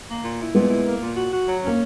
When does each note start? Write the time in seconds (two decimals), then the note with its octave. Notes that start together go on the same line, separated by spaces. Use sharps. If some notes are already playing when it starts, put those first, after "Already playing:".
0.09 A#3
0.24 A#2
0.40 E4
0.55 A#2 G#3 B3
0.70 E4
0.86 A#3
1.02 A#2
1.16 F#4
1.32 F#4
1.48 F#3
1.63 A#3 C#4